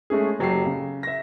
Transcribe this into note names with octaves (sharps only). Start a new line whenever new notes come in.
G#3 A3 C#4 G#4
F#1 F#3 G4 A4 C7
C#3
E5 A#6